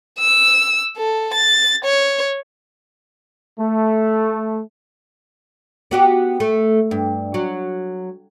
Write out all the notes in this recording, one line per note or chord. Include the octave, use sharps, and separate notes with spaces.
E6
A4
A6
C#5
A3
B3 F#4 G4
A3
G2
F#3